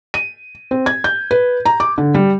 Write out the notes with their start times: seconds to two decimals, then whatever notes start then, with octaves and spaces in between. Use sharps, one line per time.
0.14 D#7
0.71 C4
0.86 G#6
1.04 G6
1.31 B4
1.65 A#5
1.80 D6
1.98 D3
2.15 G3